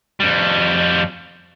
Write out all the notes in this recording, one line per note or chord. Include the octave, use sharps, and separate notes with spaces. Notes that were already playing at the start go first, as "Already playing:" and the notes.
F2 G3